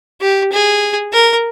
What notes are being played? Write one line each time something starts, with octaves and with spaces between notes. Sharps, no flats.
G4
G#4
A#4